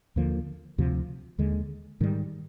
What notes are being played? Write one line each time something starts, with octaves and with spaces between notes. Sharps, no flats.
D#2 D3 F3 A#3
D2 C3 F3
D#2 D3 G#3
G#2 D#3 G3